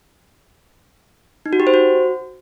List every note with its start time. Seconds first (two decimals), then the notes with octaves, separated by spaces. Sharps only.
1.46 D#4
1.53 F#4
1.60 G4
1.67 C5
1.74 F#4